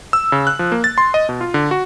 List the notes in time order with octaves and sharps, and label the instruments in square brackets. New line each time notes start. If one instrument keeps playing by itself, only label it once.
[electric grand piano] E6
C#3
F#6
F3
A#3
A6
C6
D#5
B2
F4
D3
F#4